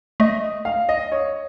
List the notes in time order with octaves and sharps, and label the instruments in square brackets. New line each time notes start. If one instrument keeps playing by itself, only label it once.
[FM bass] A3 [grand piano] D#5
[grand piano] F5
D#5
C#5